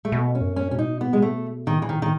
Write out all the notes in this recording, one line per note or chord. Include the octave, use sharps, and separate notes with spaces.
A3
B2 B3
C#4
F#2
C#4
B2 C#4
D#4
B3
G#3
A3
D#3
E3
D#3
D#3